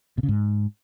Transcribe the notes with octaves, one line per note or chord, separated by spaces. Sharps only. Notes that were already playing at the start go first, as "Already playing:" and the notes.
B2
C#3
G#2